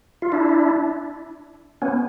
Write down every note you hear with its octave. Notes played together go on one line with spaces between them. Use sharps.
F4
D4 E4
B3 C#4